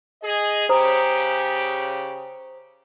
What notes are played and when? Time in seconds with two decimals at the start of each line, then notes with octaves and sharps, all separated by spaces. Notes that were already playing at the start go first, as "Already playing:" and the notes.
0.22 G#4 D#5
0.69 C#3 G4 C5 A#5 D#6